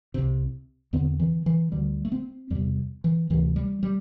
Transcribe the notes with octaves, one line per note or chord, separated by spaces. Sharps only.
C2 C3
E2 D3 C4
E3
E3
D2 D3 G3
A3
C4
E2 C3 G3
E3
D2 C3 E3
G3
G3